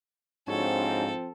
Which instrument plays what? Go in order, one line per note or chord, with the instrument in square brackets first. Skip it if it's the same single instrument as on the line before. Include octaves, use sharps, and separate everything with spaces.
[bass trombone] G#2 [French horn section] F3 C4 [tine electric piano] D4 F#4 C#5 [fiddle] A4